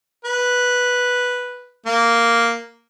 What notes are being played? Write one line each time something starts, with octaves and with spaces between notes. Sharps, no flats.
B4
A#3